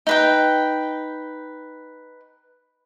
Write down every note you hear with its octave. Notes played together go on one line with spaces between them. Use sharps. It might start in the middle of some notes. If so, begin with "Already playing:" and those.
D#4 B4 G5